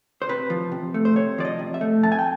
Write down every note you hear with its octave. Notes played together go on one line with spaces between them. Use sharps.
C5
C3 B4
F3
C3
A3
C5
C3 C#5
F3 D5
D#5
C3
E5
A3
F2 A5
G#5
G5